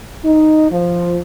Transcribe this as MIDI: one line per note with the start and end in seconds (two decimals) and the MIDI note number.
0.24 0.66 63
0.71 1.19 53